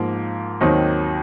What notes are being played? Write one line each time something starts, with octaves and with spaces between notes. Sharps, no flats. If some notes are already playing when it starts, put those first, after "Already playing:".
Already playing: G#2 F3 A#3
D#2 D#3 F#3 C4 D#4